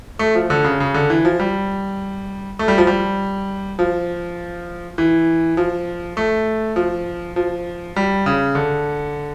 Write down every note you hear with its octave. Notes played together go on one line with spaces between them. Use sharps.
A3
F3
D3
C#3
C#3
D3
E3
F3
G3
A3
G3
F3
G3
F3
E3
F3
A3
F3
F3
G3
C#3
D3